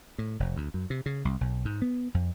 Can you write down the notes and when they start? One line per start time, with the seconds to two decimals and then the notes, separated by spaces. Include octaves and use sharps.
0.18 A2
0.40 F1
0.56 D2
0.74 F#2
0.90 C3
1.06 C#3
1.25 C2
1.41 B1
1.65 G#2
1.82 B3
2.14 F2